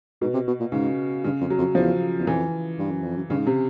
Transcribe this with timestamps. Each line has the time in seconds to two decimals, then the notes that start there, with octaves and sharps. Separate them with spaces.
0.22 G#2 B2
0.34 C3
0.47 B2
0.60 A#2
0.72 G#2 C#3
1.24 G2 C#3
1.41 F2
1.50 F#3
1.58 F2
1.75 E2 F3
2.19 E2
2.27 F2 E3
2.78 G2
2.91 F#2
3.03 F2
3.16 F#2
3.30 G2 C#3
3.38 G#2
3.47 C3